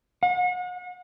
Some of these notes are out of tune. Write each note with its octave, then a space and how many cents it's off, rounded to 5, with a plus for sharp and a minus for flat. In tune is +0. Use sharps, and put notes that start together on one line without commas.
F#5 -40